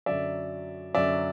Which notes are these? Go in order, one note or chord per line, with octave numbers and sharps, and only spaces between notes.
F#2 D3 F#3 D5 E5
F#2 D3 F#3 D5 E5